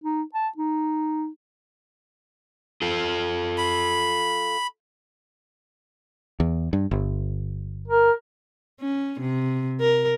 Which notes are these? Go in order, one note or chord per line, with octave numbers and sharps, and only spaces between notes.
D#4
A5
D#4
F4 A4
B5
E2
G2
G1
A#4
C#4
C3
A#4